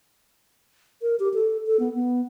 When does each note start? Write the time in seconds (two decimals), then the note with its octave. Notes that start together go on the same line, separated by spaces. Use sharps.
1.02 A#4
1.20 G4
1.34 A4
1.67 A4
1.80 B3
1.95 B3